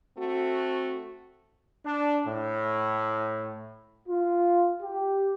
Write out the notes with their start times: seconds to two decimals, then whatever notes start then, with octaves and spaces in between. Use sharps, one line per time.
0.17 A3 C4 F#4
1.83 D4
2.26 A2
4.08 F4
4.82 G4